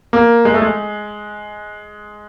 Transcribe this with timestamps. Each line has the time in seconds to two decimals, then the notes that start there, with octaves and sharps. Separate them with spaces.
0.13 A#3
0.45 G#3
0.54 A3
0.62 G#3